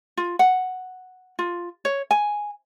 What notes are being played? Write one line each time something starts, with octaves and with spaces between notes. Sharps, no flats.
F4
F#5
F4
C#5
G#5